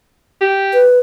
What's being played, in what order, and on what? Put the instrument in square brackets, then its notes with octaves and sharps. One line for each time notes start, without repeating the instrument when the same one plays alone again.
[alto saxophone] G4
[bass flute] B4